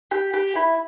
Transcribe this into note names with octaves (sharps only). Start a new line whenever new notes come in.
G4
G4
E4